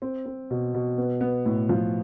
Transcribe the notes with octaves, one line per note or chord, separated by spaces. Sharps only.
C4
C4
B2
B2
B3
B3
A2
F3